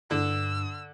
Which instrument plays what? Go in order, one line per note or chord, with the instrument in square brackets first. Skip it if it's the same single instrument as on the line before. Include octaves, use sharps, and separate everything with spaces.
[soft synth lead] G2 [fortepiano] D3 [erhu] E6